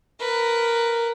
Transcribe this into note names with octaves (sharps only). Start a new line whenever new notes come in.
A#4 B4